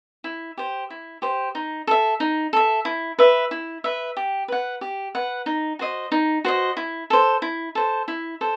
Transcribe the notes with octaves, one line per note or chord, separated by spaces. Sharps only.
E4
G4 C5
E4
G4 C5
D#4
A4 E5
D#4
A4 E5
E4
B4 E5
E4
B4 E5
G4
B4 F#5
G4
B4 F#5
D#4
F#4 C5 D#5
D#4
F#4 C5 D#5
E4
A4 C5
E4
A4 C5
E4
A4 C5